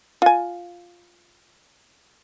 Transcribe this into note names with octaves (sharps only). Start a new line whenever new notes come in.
F4 G#5